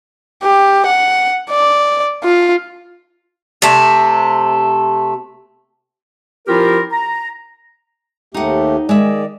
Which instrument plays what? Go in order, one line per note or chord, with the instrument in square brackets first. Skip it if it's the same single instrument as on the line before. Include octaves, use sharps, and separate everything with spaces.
[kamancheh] G4
F#5
D5
F4
[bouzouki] C3 A3
[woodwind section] F3 C4 E4 F4 G4 A#4
A#5
[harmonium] D#2 A3 G4 [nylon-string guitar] D#4 F#5
[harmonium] D#3 D5 [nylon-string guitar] G#3 E5